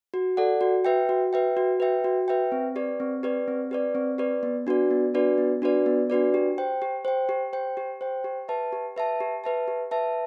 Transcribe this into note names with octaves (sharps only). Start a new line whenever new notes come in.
F#4
A4 D5 F#5
F#4
B4 E5 G5
F#4
B4 E5 G5
F#4
B4 E5 G5
F#4
B4 E5 G5
C4
G4 B4 D5
C4
G4 B4 D5
C4
G4 B4 D5
C4
G4 B4 D5
B3
D4 F#4 B4 D5
B3
D4 F#4 B4 D5
B3
D4 F#4 B4 D5
B3
D4 F#4 B4 D5
G4
C5 G5
G4
C5 G5
G4
C5 G5
G4
C5 G5
G4
B4 E5 A5
G4
B4 E5 A5
G4
B4 E5 A5
G4
B4 E5 A5